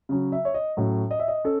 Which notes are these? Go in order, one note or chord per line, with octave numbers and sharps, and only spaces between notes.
C#3 F#3 C#4
E5
C#5
D#5
A2 F#3 C#4
D#5
E5
D#5
C#4 A4